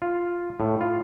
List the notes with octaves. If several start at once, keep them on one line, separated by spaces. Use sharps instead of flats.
F4
A2
F4